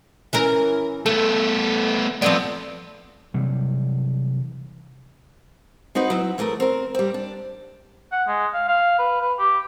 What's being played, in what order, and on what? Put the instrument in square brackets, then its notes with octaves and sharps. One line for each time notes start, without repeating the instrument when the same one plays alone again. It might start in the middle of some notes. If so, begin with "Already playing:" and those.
[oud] E3 C#4 A#4
[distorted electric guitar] A3 B3 [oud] A4
[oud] F3 C4 D5 [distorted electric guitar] A3 B3
[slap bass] C3 E3 F#3 G3
[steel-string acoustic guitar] C4 D#4 F#4 B4
F#3 E4
E3 F#3 A3 G#4 A#4
C4 A#4
G3 C4
D4
[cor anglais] F#5
G#3
F5
F5
B4
B4
G4